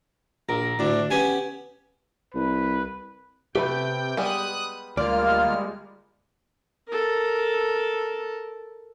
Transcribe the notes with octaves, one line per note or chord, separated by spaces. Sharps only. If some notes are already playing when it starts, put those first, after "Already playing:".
A#1 A#4
D2 A2 D4
B3 C#4 G4 G#5
C2 B4
C3 A3 B3 G4 B4 G5 B5
G3 G#3 B3 D#6 F#6
D2 G3 G#3 A#3 F4 D5 F6
A4 A#4